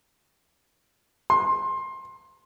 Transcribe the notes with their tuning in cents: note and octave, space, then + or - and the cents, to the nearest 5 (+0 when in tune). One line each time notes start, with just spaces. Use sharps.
C6 +20